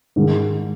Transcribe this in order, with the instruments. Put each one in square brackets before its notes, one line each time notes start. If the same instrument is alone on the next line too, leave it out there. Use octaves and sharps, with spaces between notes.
[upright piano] G#2 D#3 G#3